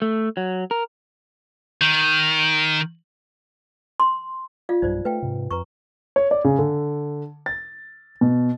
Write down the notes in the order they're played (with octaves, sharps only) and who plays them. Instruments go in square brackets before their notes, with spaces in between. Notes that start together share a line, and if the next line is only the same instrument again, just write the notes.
[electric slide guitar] A3
F#3
A#4
[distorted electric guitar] D#3
[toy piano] C6
F4 D5 F5
[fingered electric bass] B1 G2 G3 [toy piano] D#4 C5 D5
[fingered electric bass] A3 [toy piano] B4 F5 G5
[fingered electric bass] G#2 C3
[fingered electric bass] F2 [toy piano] B4 A#5 C#6
[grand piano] C#5
D5
C#3
D3
A6
B2